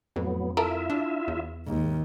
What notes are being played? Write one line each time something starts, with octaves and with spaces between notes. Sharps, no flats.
F2 A2 F#3 B3
E4 F4 A4 A#4 E5
D4
E2
D#2 G#2